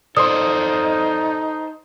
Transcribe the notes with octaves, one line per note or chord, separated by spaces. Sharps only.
D#4 A4 C5 D5 D#5 C6 D#6